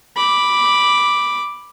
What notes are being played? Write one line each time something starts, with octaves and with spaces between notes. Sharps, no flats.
B5 D6